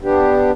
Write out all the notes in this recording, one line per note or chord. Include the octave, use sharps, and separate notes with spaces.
B3 D4 G4